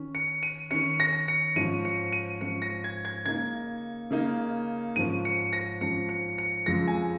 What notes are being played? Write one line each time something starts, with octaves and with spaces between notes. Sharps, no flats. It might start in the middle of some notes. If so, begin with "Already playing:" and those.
Already playing: D#3 C#4
C#7
D#7
D#3 C#4 C#7
A#6
C#7
G#2 F3 C#4 D#7
C#7
D#7
G#2 F3 C#4 C#7
A#6
G#6
G#6
C#3 A#3 D#4 G#6
C#3 A#3 D#4
G#2 F3 C#4 D#7
C#7
A#6
G#2 F3 C#4 C#7
C#7
C#7
F2 C#3 F3 G#3 A#6
G#5